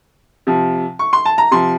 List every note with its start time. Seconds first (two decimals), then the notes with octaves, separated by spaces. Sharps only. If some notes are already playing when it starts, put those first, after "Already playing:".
0.47 C3 F3
0.99 C#6
1.13 C6
1.25 A5
1.38 A#5
1.51 C3 F3 C6